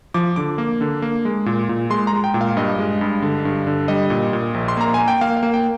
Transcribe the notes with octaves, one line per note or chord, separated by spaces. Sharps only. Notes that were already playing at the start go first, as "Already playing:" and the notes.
F3 D6
D3 D6
A#3
D3
A#3
G#3
A#2
A#2
G#3 C6
A#5
G#3
G5
A#2
F5
G2 D#5
G#3
G2
D3
G2
D3
G3 D#5
A#2
A#2
A#1
C6
A#3 A#5
A#3 G#5
G5
A#3 F5
F5
A#3
G5